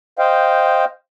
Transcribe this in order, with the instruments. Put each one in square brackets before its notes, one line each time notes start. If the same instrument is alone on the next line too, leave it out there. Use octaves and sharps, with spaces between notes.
[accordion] C5 D#5 F5 G5